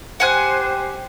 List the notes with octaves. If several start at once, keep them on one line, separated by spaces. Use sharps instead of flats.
G4 C5 F#5 G#5 F#6